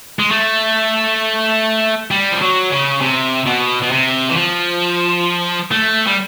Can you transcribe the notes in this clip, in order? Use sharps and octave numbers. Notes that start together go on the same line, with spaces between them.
G#3
A3
G3
F3
F#3
C#3
C3
B2
B2
C3
E3
F3
A3
G3